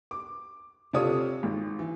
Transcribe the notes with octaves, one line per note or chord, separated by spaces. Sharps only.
D6
C3 F4 A4 C#5 D#6
G#1
E3